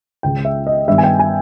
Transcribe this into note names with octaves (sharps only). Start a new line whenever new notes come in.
C#2 C#3 G#3 G5
E5
D#5
G2 D#3 G3 B3 E5
G#5
G5
G#5